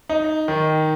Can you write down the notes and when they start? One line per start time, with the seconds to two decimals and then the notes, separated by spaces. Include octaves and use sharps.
0.09 D#4
0.48 D#3